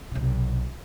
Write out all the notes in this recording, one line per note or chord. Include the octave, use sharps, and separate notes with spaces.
B1 C3